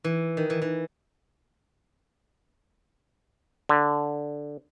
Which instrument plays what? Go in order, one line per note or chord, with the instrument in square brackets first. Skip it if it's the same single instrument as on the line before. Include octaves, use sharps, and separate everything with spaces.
[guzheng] E3
D#3
E3
E3
[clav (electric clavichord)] D3